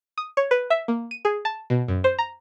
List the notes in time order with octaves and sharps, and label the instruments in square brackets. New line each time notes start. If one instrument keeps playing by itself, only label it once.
[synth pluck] D#6
C#5
B4
E5
A#3
D#7
G#4
A5
B2
F#2
C5
A#5